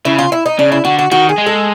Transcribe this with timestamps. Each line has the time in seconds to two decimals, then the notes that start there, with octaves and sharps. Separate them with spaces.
0.05 C#3 E4
0.19 F4
0.32 E4
0.46 D#4
0.59 C#3 D4
0.72 E4
0.85 D3 F#4
0.99 F#4
1.11 D#3 F#4
1.29 G#4
1.38 G#3
1.46 A4